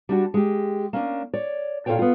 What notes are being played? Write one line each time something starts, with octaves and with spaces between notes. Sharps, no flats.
G3 D4 F#4
G#3 G4
A#3 C#4 D4
C#5 D5
A#2 F4 A4 C5 C#5 G5
B3 F4